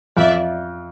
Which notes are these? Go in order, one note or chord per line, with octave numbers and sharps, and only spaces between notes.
F2 D5 E5